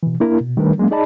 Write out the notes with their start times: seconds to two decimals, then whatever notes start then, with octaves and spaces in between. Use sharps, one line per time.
0.03 B2 E3
0.20 A#3 D4 E4 A#4
0.41 B2
0.57 D#3 G3 A3 D4 A#4 B4
0.78 F#3 G#3 A#3 C#4
0.91 D#4 G#4 D5 D#5 A5 B5